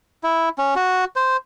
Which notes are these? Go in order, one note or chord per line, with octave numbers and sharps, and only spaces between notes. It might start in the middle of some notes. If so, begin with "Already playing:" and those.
E4
C#4
F#4
C5